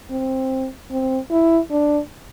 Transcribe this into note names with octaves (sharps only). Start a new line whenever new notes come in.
C4
C4
E4
D4